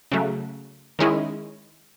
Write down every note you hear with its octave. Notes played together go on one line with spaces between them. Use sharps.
C#3 F#3 A3
D#3 G#3 C#4 E4